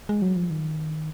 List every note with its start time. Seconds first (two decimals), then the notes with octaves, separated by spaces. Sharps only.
0.09 G#3
0.22 F#3
0.36 F3
0.50 D#3